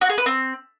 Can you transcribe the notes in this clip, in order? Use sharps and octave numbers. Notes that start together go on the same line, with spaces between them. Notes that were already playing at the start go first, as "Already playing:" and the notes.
F#4
G#4
B4
C4